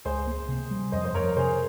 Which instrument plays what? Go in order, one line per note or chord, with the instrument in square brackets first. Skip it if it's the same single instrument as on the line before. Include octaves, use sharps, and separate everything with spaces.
[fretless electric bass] C#2 [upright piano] G#4 C5
[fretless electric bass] A#3
C3
G3
[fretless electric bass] F2 [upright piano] C5 D#5
[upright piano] C5
[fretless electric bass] F2 [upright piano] A#4 C#5
[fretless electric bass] C3 [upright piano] G#4 C5